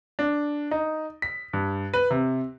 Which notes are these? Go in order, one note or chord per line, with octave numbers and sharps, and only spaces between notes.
D4
D#4
B6
G2
B4
C3